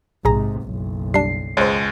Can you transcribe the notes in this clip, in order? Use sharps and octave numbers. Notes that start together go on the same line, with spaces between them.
A#1 G#2 C3 G#4 A#5
F#1 B1
G3 D4 C7
C#2 G#3 C5 C#5